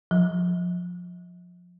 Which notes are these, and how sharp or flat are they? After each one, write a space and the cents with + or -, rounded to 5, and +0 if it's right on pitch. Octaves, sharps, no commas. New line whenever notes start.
F3 +25